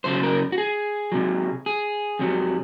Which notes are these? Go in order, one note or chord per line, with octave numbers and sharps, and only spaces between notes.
F#2 C#3 F#3 C5
A#4
F#4
G#4
C3 F#3
G#4
F2 C3 F#3